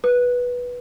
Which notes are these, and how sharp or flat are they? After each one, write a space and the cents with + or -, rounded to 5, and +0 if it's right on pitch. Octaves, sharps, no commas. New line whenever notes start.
B4 -10